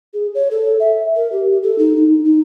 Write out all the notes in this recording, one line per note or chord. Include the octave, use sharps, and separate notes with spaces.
G#4
C#5
A4
E5
A#4
G4
G4
A4
D#4
D#4
D#4